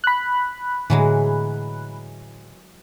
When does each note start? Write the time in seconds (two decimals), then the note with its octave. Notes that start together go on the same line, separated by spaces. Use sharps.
0.04 B5 F#6
0.90 A2 D3 E3 F#3 G#3